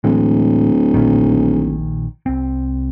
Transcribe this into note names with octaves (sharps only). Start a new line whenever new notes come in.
D1 A2 E3 G#3
A#1 A#2 D#3
C2 C4